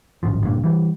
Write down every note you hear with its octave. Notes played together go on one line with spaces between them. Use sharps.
D1 G#1 F#2 F3
F#1 D2 G2 A#2
E3 G3